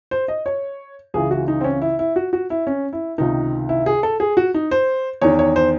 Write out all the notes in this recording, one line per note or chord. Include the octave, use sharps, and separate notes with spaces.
C5
D#5
C#5
C#2 C#3 E3 G#4
F#4
D#4
C4
C#4
E4
E4
F#4
F#4
E4
C#4
E4
C#2 C3 D#3 D#4
E4
G#4
A4
G#4
F#4
D#4
C5
E2 D#3 C#5
C#5
C5